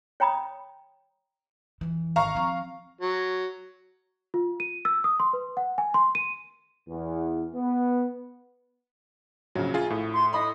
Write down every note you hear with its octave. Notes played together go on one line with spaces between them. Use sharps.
C#5 G5 A#5 B5 D#6
F2 E3
G#1 F5 A#5 C#6
F3 C4
F#3
F4
D#7
E6
D#6
C6
B4
F#5
G#5
C6
D#7
E2
B3
A#1 C#3 F#3
F4 G#4
A2
C6
D#5 B5 C6 D#6